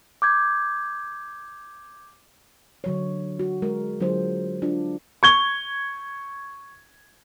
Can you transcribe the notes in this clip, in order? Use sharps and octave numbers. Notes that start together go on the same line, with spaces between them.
D6 G6 G#6
D3 F#3 C#5
F#4
G#3 A#4
D3 F#3 D4 F4 G#4 C5
D4 F4
C#6 G#6 G7